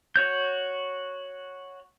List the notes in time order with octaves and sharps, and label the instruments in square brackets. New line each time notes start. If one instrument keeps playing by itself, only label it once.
[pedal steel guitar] F#4 C#5 G6